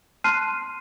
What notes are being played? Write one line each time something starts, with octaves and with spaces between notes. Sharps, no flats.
A5 C6 F6 F#6 C7 D#7